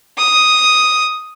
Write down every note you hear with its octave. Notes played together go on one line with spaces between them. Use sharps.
D#6